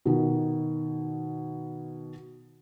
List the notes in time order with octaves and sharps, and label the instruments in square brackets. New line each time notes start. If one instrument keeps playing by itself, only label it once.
[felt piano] B2 D#3